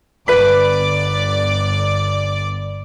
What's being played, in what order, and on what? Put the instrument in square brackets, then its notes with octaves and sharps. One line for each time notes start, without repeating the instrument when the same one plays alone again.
[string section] G1 D5 D6 [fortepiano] B4 B5